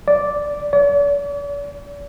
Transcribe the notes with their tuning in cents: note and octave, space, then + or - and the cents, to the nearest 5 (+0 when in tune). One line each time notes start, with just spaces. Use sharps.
D5 -5
D5 -45